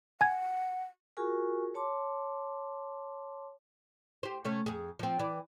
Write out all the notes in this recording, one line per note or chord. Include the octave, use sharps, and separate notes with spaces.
F#5 G#5 G#6
F4 F#4 G#4 A#4 G#5 C#6
C#5 A5 C6 D6
G4 C5
C3 A3 C#4
F2 G#4
F3 C4
E3 D5